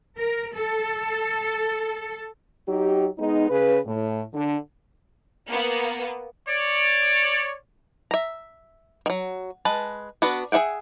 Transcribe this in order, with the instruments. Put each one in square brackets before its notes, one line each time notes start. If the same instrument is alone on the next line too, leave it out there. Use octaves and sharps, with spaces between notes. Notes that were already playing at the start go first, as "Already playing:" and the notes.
[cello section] A#4
A4
[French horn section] F#3 D#4 G4
G#3 B3 D#4
C#3 B4
A2
D3
[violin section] A#3 B3
[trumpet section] C#5 D5
[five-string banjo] E5 A#5
D#3 F#3
G#3 B4 A5
B3 D4 F#4 B4
G#4 C5 E5 F#5 G5